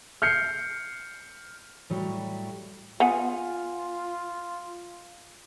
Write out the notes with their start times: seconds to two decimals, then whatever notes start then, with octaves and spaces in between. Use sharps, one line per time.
0.22 F6 G6 C7 C#7
1.90 A2 F#3 G3
3.00 B3 F4 F#5 G#5